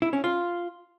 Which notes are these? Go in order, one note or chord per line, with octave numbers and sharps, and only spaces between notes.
E4
C#4
F4